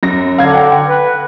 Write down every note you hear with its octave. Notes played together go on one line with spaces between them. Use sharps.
F#2 A#6
D3 F5 G#6
F#5 G5
B4